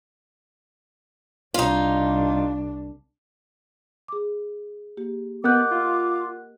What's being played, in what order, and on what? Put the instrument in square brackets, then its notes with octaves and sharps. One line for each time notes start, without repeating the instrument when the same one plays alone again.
[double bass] C2 D4 [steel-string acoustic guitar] D#4 F4
[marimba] G#4 D6
A#3 G4
[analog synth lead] B3 [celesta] A#4 F#5 F#6 [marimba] D#5 G6 [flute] D6
[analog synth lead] F4